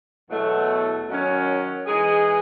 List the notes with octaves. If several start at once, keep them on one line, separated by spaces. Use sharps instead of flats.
E2 B2 F#3 A3
F#2 D#3 F#3 C#4
E3 G#3 D#4 G#4